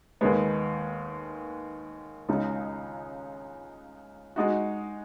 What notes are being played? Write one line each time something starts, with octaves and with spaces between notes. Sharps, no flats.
D#2 D#3 G#3 B3
C#2 C#3 G#3 D#4
G#3 D#4 F#4